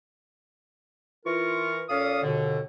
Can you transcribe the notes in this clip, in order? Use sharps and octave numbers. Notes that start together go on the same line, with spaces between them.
E3 F4 A#4 C#6
A#2 C#4 A4 D5 F5 D#6
D#2 B2 D3